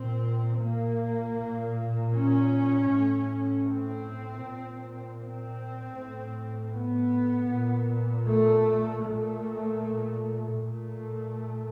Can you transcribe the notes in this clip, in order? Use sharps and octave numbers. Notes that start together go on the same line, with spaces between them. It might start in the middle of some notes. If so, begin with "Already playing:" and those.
Already playing: A#2 C4
A#3
A#2
C#4
A2
C4
A#2
C4
A2
B3
A#2
A3
A#2 A3
A#2 A3